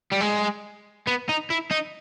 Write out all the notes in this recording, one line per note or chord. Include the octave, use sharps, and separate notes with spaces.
G3
G#3
B3
D#4
E4
D#4